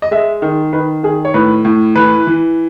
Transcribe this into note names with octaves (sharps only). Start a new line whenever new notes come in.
D#5
G#3 E5
D#3
D#3 B4
D#3 G#4
C#5
A2 B4
A2
E3 B4
E3